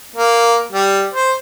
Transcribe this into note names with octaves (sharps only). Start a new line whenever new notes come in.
A#3
G3
C5